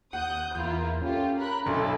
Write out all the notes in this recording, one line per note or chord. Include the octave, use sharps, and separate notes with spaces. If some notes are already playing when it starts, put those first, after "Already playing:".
D#2 F#5 D#6 F#6 G6
E2 A#3 E4 F4 G6
C#4 F4 G4 A4
A#4 B5 F#6
B1 D4 E4 A4 C6